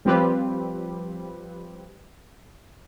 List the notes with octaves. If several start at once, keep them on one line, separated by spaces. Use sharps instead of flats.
F3 G3 C4 F4 G4 B4